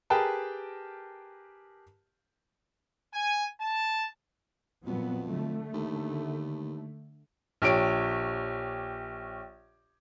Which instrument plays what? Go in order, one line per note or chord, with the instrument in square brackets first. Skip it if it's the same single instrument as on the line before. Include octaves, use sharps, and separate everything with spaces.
[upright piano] G4 G#4 A#4 B4 G5 A5
[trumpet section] G#5
A5
[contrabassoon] F2 [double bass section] A#2 F#3 B3
[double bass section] D3 A3
[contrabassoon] D#2
[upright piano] A#1 G4 C#5 D7